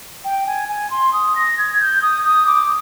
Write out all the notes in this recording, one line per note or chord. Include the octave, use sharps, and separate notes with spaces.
G5
G#5
G#5
C6
D#6
A#6
G#6
G6
D#6
D#6
D6